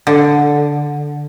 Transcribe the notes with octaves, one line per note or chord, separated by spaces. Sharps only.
D3